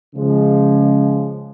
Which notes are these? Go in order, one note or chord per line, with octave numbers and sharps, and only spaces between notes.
C#3 F3 G#3